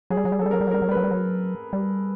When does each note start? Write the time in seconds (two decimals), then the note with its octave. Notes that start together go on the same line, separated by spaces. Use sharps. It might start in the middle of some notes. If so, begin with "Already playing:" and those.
0.10 F#3 G#4
0.17 G3
0.25 F#3
0.32 G3
0.39 F#3 A4
0.46 G3
0.51 F#3 A#4
0.61 G3
0.67 F#3
0.71 G3 A#4
0.82 F#3
0.89 G3
0.91 B4
0.97 F#3
1.04 G3
1.11 F#3
1.73 G3